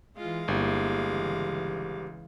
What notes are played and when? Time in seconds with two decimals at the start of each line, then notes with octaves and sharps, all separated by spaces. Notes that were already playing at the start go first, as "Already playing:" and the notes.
0.17 E3 G#3 F4 F5
0.48 G1 A#3 E4 G4
1.09 C#3 E3